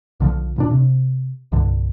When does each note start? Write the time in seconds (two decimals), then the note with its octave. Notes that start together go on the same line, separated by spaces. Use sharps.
0.20 B1 D3 D#3 F3
0.56 D#1 A#2 D4
0.71 C3
1.52 C2 G2 D3